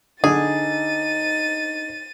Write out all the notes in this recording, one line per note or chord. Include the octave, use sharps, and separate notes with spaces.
D3 D#4 G#4 A6 D#7